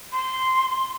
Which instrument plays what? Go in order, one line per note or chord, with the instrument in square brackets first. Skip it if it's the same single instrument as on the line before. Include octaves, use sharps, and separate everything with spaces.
[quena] C6